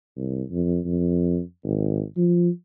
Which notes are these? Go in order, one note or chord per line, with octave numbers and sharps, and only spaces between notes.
C2
F2
F2
G#1
F3